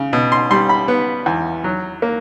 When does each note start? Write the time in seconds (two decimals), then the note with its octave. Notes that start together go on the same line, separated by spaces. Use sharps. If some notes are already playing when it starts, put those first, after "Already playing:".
Already playing: C#3
0.13 B2
0.32 C6
0.51 G3 C6
0.69 B5
0.88 B3
1.26 E2
1.64 F#3
2.02 A#3